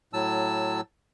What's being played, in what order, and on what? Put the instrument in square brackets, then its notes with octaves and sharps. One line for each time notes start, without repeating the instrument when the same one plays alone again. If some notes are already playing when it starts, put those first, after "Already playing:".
[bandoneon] A2 F#3 A5 E6